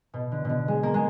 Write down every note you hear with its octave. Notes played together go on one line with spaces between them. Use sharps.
B2
D3
B2 D3
G#3
A#3
G#3